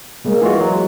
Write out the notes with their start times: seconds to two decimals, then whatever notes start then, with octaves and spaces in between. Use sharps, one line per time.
0.25 G3 G#3 A#3
0.41 E3 G#3 F4 F#4
0.61 F#3